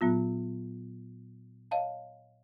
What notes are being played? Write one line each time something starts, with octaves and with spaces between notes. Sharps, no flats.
A#2 F#3 B3 F4
C#5 D#5 F5 A5